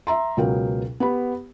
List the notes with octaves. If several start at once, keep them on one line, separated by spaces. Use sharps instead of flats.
E5 A#5 C6
C#2 B2 F#3 A#4 F5 G5
B3 G4 B5